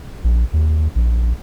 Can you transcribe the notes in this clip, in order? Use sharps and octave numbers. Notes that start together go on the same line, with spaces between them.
A#1
D#2
A#1